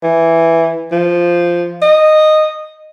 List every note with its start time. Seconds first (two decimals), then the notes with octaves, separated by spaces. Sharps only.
0.03 E3
0.92 F3
1.82 D#5